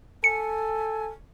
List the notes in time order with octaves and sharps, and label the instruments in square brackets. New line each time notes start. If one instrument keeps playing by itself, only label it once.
[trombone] A4 [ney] G#5 [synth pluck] C#7